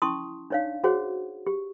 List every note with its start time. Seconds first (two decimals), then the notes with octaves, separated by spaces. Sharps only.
0.02 C#4 E4 A5 C6 C#6 D#6
0.50 D4 D#4 C#5 D5 F5
0.84 F#4 G#4 C5 C#5 F#5
1.47 G4